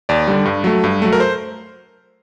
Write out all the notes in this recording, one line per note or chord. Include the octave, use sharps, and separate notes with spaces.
D#2 D5
D3 G3
G2
F#3 A3
G2
F#3 A3
A#4
C5